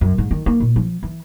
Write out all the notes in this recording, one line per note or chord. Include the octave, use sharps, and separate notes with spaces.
F#2
G#2
D#3
A#3
A#2
F3
E3